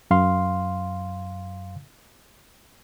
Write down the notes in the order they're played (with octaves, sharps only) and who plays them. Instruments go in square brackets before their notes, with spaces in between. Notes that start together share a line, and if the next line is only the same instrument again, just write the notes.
[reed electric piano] F#2 F5 C6